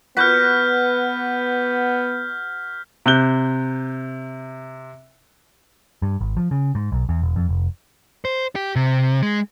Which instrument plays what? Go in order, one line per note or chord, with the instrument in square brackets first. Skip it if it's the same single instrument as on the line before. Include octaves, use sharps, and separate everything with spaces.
[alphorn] B3 [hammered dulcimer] F#4 B4 [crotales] F6 G6 B6
[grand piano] C3 F#6 G6 G7
[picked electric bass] G2
G#1
F3
C#3
G#2
B1
E2
E1
F2
F1
[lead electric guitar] C5
G4
C3
G#3